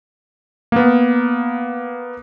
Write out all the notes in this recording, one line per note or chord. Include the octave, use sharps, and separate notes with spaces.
A#3 B3